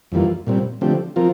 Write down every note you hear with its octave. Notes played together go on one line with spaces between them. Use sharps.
F2 E3 G3 A#3 F4
A#2 G3 C4
D3 F3 A3 C4 G4
F3 C4 F4 A#4